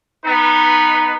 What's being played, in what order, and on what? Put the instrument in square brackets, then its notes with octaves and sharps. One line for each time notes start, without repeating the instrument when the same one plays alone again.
[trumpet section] B3 D#4 B4